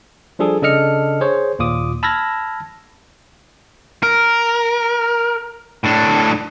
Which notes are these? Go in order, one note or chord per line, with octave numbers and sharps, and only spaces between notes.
F3 G3 D4 G#4 A4
C#3 D4 A4 D#5 F6 C#7
G#4 C5 C#5
D#2 A#2 F4 D6 D#6
A5 B5 E6 F6 G#6 A#6
A#4
A2 D4